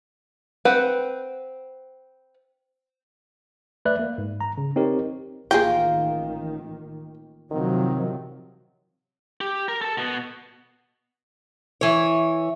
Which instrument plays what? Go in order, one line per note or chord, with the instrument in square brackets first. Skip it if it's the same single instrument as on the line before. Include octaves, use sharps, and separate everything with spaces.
[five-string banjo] C4 B4 F#5
[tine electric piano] A3 B4 D5 E5 F#6
A#3
G#2
A#5
C#3
C4 D#4 G4 A#4 C#5
[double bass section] A1 D#3 [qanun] A#3 F4 A#4 [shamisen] G#4 G5
[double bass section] C3 F3 F#3 [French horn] D#3
[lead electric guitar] G4
A#4
A4 A5
B2 B3
[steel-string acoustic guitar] E3 C#5